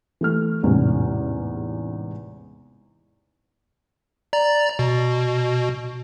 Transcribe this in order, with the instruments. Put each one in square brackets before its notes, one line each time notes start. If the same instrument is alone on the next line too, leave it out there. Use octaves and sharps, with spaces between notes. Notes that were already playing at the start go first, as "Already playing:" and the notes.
[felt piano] E3 A3 F6
A1 E2 G#2 C3 C#4
[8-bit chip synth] D5 A#5 A6
B2